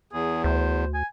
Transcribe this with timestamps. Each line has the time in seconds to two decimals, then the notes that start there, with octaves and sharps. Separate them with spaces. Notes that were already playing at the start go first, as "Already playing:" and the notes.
0.13 E2 G#4
0.44 D2 C5
0.94 G#5